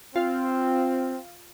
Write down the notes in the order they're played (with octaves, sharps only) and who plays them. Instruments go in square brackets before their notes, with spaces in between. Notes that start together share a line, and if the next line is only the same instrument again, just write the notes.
[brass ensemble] C4 [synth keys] F4 F5